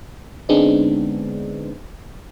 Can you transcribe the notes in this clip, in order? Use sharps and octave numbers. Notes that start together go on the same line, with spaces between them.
D3 G#3 B3 C4 D4 D#4